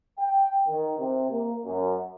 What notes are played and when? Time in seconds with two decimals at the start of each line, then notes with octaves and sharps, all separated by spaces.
0.18 G5
0.68 D#3
0.99 C3
1.30 A#3
1.66 F#2